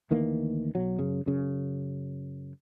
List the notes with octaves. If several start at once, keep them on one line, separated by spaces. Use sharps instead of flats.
D2 D#3 E3 A#3
B1 F#3
F#2 C#3
F#2 C#3